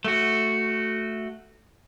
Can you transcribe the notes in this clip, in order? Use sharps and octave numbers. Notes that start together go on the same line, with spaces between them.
A3 F#4